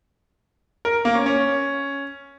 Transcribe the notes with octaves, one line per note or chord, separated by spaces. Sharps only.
A#4
A#3
C#4
C#4